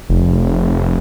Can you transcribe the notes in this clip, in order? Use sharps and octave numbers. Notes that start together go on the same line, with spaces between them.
F1